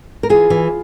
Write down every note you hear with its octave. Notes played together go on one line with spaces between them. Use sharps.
A#4
E3 F4 G#4
E3